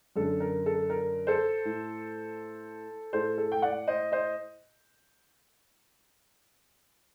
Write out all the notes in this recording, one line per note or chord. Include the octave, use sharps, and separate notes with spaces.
F#2 D3 A4
A#4
A4
A#4
A4 C5
A2
A2 A4 C5
A4
G5
D5 F#5
C5 D#5
C5 D#5